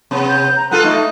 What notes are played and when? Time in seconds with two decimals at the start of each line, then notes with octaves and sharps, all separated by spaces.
0.11 C3 B3
0.29 G6
0.57 A#5
0.71 B3 F4 A4 F#6
0.84 A3 D#4